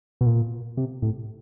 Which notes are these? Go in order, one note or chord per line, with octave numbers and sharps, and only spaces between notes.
B2
A#2
C3
A2